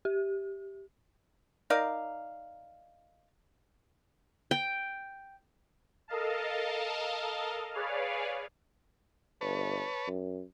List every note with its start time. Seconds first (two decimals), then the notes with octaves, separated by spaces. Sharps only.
0.05 G4
1.70 D#4 A#4 D5 F5
4.51 G5
6.08 A4 A#4 D#5 F5 A5
7.74 G#4 B4 C#5 D5 F5
9.41 G1 B4 C#5 A5
10.07 F#2